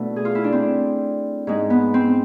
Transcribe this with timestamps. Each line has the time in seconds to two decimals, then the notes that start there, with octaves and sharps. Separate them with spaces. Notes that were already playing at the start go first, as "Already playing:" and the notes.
Already playing: B2 A3 D4 E4
0.16 G#4
0.25 F4
0.35 E4
0.44 D4
0.53 C4
1.47 G#2 G#3
1.70 B3
1.94 C4